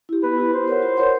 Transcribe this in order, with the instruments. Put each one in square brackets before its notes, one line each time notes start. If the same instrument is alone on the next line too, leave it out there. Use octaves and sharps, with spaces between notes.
[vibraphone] E4 G4
[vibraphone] B3 [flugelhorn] B4
[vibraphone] E4 G4
[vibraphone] F4 [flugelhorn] C5
[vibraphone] A#4 C#5 F#5
F4
A#4 C#5 F#5